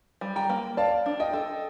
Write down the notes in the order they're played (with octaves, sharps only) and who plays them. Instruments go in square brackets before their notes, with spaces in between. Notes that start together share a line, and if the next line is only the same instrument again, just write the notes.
[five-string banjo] G3
[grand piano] G5 A#5
[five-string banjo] A#3
[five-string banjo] D5 [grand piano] F5 A5
[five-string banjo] D4
[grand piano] D#5 G5
[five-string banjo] A4